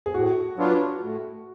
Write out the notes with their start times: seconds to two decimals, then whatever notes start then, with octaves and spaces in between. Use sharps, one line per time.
0.06 G#4
0.14 A2 F#4
0.57 F#3 B3 D4 F4
1.01 A2